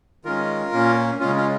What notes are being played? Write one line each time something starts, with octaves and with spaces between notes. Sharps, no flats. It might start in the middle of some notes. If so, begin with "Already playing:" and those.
D#3 G#3 C#4 F4 A#4
A#2 A#3 C#4
C#3 G#3 C#4 F4
C#4 F4